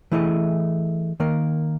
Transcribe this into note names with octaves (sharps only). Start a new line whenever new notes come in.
E3 A3 E4 G#4 D#5
D#3 A#3 A#4